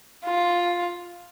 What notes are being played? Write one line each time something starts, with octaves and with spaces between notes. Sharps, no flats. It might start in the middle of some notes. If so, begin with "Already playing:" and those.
F4